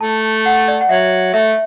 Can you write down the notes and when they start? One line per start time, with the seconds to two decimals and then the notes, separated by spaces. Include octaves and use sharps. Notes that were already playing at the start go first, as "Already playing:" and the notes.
0.01 A3 A5
0.46 F#5
0.68 D5
0.81 F#5
0.89 F#3 E5
1.34 A3 E5